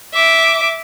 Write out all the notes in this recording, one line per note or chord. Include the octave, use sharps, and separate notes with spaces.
E5 D6